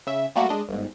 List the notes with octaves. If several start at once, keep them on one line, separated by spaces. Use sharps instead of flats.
C#3 E5
G3 A3 A#3 F#4
G#3 D4 D#5
G1 G#2